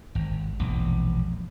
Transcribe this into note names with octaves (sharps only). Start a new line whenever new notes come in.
G#1
E1 A#1